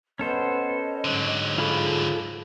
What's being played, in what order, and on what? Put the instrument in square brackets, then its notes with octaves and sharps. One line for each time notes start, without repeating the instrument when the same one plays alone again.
[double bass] B3 [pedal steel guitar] C#4 A4 C5 [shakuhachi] D#5
[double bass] G#2 [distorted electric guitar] D3 F#3
[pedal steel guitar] F4 G#4 B5 [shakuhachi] A4